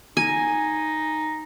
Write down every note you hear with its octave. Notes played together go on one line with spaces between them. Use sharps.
D#4 G#5